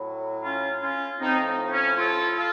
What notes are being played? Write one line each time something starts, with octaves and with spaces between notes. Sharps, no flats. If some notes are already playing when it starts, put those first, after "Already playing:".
Already playing: A2 F#3
C#4 F4
C#4 F4
A2 F3 C4 D#4
C#4
F4 A4
F4 A4